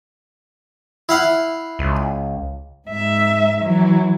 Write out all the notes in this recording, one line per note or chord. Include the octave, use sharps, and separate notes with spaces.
E4 F5 F#5
C#2
G#2 E5
E3 F#3